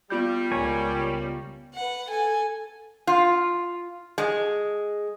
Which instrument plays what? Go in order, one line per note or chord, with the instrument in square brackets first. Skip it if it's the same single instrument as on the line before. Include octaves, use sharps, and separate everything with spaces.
[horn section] G3 [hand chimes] B3 F4 G6
[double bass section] C#2 [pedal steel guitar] A#4 C#5 G#5
[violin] B4 F#5
A4 G#5
[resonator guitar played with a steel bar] F4
G#3